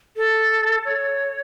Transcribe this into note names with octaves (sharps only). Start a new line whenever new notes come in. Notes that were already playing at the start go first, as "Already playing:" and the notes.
A4
C#5